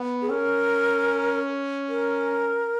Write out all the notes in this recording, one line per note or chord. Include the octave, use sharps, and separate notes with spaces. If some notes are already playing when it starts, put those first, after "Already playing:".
Already playing: B3
G#4
C#4 A#4
A#4